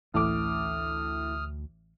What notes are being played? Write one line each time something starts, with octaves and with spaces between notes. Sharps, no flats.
A1 D2 A2 E3 D6 D#6 F6